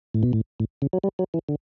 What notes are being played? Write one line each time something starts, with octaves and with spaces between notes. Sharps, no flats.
A2
B2
A2
A2
C#3
F#3
G3
F#3
E3
D3